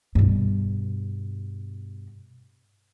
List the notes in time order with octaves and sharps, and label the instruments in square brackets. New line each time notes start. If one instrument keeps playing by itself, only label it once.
[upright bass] G2 B2